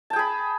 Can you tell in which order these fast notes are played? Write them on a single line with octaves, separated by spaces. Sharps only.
A5 G5 G#4 B5